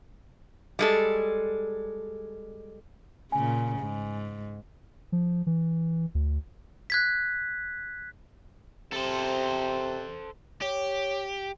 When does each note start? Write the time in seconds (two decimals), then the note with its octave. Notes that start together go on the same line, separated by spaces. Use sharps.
0.79 G3 G#3 A4
3.32 A#2 C#3 G#5
3.79 G#2
5.12 F3
5.47 E3
6.15 D2
6.90 F#6 G#6 B6
8.93 C3 A4 C5
10.62 G4 C#5